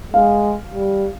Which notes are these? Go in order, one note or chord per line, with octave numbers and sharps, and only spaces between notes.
G#3 F5
G3